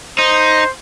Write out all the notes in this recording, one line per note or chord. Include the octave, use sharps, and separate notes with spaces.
D#4 C5